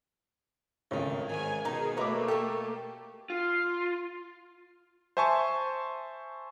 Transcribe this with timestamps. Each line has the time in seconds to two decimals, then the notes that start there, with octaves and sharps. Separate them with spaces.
0.91 G#1 C#2 A2 D#3
1.30 G#2 D#3 G#5
1.65 B2 D#3 D#4 G#4
1.97 A3 A#3 E4 B4 C#5 D#5 A#5 D6
2.28 G4 A4 C#6
3.30 F4
5.17 C5 E5 G#5 A5 C#6